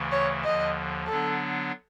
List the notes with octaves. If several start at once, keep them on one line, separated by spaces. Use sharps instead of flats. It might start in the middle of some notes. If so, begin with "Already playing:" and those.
Already playing: D2 C#3 E3 A3
C#5
D#2 D3 F3 D#5
D3 F#3 B3 D4 A4